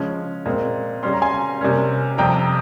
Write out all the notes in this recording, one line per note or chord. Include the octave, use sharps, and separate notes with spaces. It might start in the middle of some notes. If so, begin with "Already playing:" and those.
Already playing: C#3 F3 G#3 C#4
A#2 G#3 C4
C#3 G3 C#4 C6
A#5
G#5 C6
C3 G3 A#3 C#4
F2 C3 G3 G5 A#5